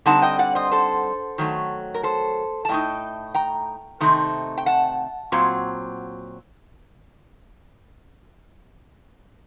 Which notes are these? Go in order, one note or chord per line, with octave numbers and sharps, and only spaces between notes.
D3 G3 C4 D#4 F#5 A5
D#5 G5
D5 F#5
C5 D#5
A4 C5
D#3 F#3 A3
A#4
A4 C5
A5
A2 A3 D#4 D#5 G5
G5 A#5
C3 D#3 A3 C4 D#4
G5
F#5 A5
A#2 F#3 C4